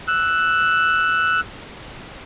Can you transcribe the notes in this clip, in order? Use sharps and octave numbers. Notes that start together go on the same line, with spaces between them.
E6 F#6